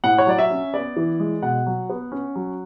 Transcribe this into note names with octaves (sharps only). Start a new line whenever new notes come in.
A2 F#5
C#5
F#3 D5
E5
C#4
B3 D5
E3
G#3
B2 F#5
F#3
B3
C#4
F#3